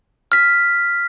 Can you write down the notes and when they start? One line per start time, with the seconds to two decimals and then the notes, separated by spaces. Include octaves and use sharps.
0.32 F6 B6